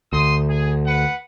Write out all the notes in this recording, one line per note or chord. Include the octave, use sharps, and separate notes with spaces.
D2 C6 D#6
G#4
B4 F#5